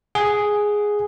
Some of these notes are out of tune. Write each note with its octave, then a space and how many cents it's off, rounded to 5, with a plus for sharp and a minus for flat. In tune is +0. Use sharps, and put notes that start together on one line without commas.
G#4 +0 F#5 +5